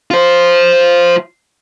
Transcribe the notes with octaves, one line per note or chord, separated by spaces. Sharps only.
F4 C5